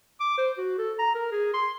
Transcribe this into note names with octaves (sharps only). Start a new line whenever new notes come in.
D6
C5
F#4
A4
A#5
A#4
G#4
C6